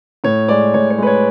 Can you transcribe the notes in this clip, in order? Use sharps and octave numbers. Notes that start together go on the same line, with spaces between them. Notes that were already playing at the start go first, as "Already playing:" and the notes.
A2 C#5
G#3 D5
A2 C#5
C#5
G#3 B4
C#5